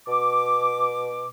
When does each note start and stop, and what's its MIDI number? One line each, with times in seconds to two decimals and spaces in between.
0.08 1.27 47
0.08 1.27 86